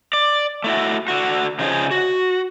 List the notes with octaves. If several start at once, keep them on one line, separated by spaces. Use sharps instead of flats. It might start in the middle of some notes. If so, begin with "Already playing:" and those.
D5
A3 E4 F#4
D3 F#4
C#3 F3 D#4 G#4 C5 C#5
F#4